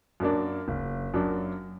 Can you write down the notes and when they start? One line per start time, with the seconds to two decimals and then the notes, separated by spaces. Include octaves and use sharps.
0.20 F#2 F#3 A#3 D4
0.68 F#1
1.14 F#2 F#3 A#3 D4